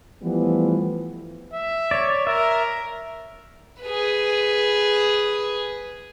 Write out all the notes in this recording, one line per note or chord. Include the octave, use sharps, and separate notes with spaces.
E3 F3 G3 A3 B3
E5
C#5 D5
A#4 E5
G#4 B4